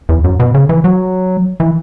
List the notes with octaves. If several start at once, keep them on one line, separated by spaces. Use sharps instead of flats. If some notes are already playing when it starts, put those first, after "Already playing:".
E2
F#2
B2
C#3
E3
F#3
E3